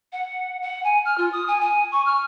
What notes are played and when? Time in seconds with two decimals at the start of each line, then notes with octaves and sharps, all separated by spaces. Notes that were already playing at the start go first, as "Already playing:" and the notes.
0.12 F#5
0.61 F#5
0.84 G#5
1.05 F6
1.17 F4
1.32 D#6
1.47 G#5
1.61 G#5
1.91 C#6
2.06 F6